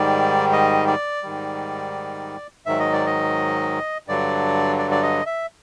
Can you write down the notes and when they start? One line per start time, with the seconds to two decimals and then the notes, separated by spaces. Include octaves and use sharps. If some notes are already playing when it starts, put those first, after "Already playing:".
Already playing: G#2 D#3 G3 D5
0.52 D#5
0.87 D5
1.23 G#2 D#3 G3
2.66 G#2 D#3 F#3 E5
2.80 D#5
2.93 D5
3.06 D#5
4.07 G2 D3 F#3 D5
4.78 D5
4.91 D5
5.03 D#5
5.26 E5